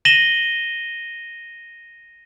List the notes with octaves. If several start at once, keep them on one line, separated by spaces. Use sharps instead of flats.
A#6 D#7 E7 F#7 G7